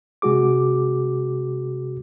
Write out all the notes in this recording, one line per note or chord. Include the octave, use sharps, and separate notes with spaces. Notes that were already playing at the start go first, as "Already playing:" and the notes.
C3 G#3 F#4 G#4 D6